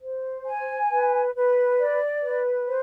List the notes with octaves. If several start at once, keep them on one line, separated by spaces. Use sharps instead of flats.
C5
G#5
B4
B4
D5
B4
C5